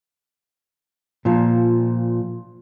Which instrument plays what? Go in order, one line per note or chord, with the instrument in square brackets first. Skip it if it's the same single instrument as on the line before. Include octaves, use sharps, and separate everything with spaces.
[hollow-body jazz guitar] A#2 F3